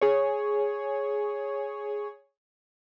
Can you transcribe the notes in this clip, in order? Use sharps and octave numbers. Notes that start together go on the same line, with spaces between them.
G#4 C#5